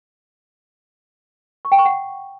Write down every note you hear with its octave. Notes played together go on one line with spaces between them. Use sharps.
C#6
G5
C#6
F#5